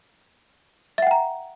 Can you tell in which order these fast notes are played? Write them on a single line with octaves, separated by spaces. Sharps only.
E5 F#5 G5 A#5